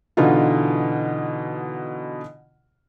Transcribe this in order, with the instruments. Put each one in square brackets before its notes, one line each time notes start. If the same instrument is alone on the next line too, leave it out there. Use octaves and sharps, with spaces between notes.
[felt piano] B2 D3 E3 D#4 F4